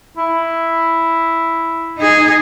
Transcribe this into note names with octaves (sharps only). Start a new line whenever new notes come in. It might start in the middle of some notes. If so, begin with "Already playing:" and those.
E4
D#4 G#4